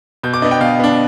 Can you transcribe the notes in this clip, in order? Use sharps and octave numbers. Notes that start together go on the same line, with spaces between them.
B2 G6
D6
B3 D4 D#5
G5
B2 F5
B3 D4